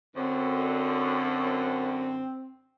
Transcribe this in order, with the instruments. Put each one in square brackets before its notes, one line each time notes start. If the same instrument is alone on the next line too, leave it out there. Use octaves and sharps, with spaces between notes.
[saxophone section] F#2 D3 [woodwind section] C4